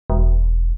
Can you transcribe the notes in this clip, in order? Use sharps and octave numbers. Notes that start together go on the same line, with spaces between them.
E1